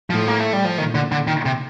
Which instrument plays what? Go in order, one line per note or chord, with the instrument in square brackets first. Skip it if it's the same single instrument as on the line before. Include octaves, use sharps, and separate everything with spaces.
[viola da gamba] A2 [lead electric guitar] F3
[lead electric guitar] A#3
A3
G3
F3
[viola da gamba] A#2 [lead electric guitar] D#3
[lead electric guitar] D3
D3
D#3
C3